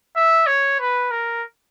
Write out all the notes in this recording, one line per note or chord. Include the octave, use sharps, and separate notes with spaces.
E5
C#5
B4
A#4